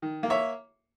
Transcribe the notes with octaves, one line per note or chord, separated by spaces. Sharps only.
D#3
A#3
C#5 E5